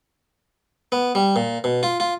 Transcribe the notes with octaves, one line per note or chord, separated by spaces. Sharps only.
B3
G3
A#2
B2
F4
F4